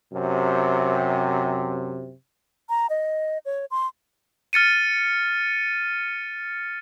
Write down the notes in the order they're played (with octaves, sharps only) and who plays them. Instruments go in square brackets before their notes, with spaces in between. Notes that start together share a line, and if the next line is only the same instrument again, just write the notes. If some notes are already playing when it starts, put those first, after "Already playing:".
[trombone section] F#2 C3
[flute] A#5
D#5
C#5
C6
[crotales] F6 A6 C#7 D#7